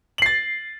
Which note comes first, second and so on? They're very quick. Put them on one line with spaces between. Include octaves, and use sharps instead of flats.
F#7 C7 A6